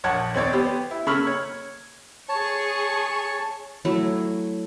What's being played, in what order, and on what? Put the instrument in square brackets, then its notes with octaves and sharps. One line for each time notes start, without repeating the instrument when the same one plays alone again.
[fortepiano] A#1 C#5 F#5 A5
D#2 C4 C#5 D5
B3 G4 C5
E4
C#3 A#3 B5 C#6 E6 F6
C#5
[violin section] G#4 C#6 [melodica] C#5 A5
[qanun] F#3 A3 E4